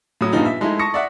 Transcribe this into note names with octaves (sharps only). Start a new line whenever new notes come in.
A2 F#3 D#6
G2 A#2 F3 B3 D#4 F4
E5
F3 G#3 A3 D#4 E4
A5 C#6 D#6 A#6 C#7
D5 E5 F#5